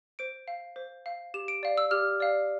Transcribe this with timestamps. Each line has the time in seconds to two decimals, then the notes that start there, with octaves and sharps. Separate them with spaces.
0.19 C5 D7
0.48 F5
0.76 C5
1.06 F5
1.34 G4 E7
1.48 D7
1.63 D5 F5
1.78 E6
1.91 G4 F6
2.20 D5 F5